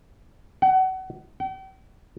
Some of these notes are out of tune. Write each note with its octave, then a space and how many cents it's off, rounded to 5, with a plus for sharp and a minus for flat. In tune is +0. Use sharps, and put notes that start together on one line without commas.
F#5 +30
G5 -40